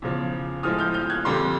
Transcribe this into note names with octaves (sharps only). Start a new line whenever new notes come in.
E2 C#3 F3
A2 F3 G#3 D#6 F6
F6 G6
F6 G6
F#6 G#6
F2 D3 G3 A#3 C6 D6